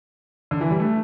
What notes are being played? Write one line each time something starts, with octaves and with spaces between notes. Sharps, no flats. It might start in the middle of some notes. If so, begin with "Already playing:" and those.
D3
E3
G3
A3